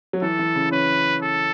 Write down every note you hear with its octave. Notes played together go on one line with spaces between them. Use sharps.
F#3
E3 A4
E3
C#3
C#4 B4
A4